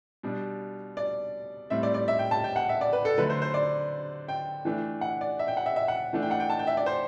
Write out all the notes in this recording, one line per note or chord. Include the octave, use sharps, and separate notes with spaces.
B2 G3 D4
D5
A2 G3 C4 E5
D5
D5
E5
G5
A5
G5
F#5
E5
D5
B4
A4
D3 F#3 A3 B4
C5
C5
D5
G5
E3 A3 D4
F#5
D5
E5
G5
F#5
E5
E5
F#5
E3 A3 D4
G5
F#5
G5
A5
G5
E5
D5
C5